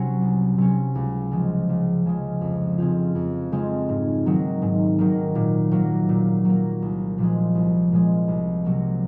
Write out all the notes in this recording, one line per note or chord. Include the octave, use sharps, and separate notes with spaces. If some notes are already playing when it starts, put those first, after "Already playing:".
Already playing: C3 F#3 C#4
C2
C3 F#3 C#4
C#2
C#3 F3 G#3
C#2
C#3 F3 G#3
F2
C#3 G#3 C4 F4
F2
C#3 G#3 C4 F4
G#2
D#3 F#3 A#3
G#2
D#3 F#3 A#3
A#2
F#3 A#3
A#2
F#3 A#3
C2
A#2 F3 G#3
C2
A#2 F3 G#3
C2
C3 F#3 A#3